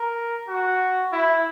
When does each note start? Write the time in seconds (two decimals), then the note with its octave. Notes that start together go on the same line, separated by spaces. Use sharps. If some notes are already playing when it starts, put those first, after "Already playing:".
Already playing: A#4
0.48 F#4
1.12 E4